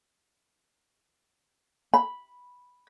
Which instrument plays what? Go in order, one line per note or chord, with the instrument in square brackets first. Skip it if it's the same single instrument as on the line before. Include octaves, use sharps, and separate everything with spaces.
[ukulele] B5